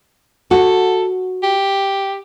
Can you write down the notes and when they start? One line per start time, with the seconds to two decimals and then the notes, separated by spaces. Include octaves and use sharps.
0.51 F#4 A4
1.43 G4